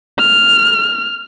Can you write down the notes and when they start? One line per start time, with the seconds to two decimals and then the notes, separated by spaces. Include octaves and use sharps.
0.19 F6